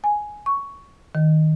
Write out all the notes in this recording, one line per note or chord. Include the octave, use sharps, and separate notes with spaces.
G#5
C#6
D#3